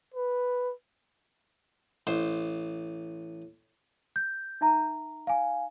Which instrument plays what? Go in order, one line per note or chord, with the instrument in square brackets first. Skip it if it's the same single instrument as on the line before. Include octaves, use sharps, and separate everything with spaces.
[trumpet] B4
[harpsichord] A1 C5
[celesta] G6
[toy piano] D#4 E5 A#5
[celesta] F5 G#5